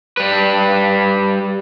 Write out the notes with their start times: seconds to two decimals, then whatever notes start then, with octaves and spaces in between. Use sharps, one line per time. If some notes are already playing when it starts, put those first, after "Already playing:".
0.17 G3 B4